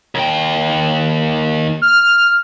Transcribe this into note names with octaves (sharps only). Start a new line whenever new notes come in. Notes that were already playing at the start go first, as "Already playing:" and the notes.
D#2 G5
F6